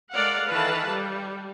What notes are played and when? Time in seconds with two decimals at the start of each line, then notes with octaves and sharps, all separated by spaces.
0.14 G#3 A4 A#4 D5 F5 F#5
0.48 D#3 E3 A4 B4 F5 A5
0.91 G3